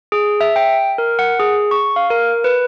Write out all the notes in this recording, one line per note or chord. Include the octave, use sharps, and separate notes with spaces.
G#4
E5
G5
A#4
F#5
G#4
C#6
F5
A#4
B4